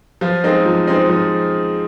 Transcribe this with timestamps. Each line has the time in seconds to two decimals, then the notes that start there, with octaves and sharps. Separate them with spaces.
0.21 F3 F4
0.44 G#3 C4 D#4
0.65 F3
0.87 G#3 C4 D#4
1.09 F3